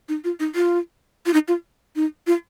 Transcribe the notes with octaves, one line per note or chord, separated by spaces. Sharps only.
D#4
F4
D#4
F4
F4
D#4
F4
D#4
F4